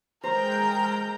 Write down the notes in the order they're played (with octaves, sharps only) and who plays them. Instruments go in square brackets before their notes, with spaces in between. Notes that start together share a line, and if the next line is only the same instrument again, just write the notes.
[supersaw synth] G#3 G5 G6 [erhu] A#4 [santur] C5 [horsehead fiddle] A#5